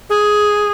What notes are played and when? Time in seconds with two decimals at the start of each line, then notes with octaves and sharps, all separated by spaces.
0.10 G#4